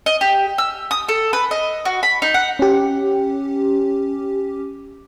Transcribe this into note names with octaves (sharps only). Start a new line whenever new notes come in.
D#5
G4
E6
D#6
A4
B4
D#5
F#4
B5
D#4
F#5
C#4 G4